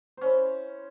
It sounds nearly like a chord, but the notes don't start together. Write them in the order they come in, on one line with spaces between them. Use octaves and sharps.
C5 C#4 E4